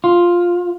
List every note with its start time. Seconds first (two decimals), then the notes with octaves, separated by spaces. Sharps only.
0.04 F4